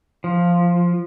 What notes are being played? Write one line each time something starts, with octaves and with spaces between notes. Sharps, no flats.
F3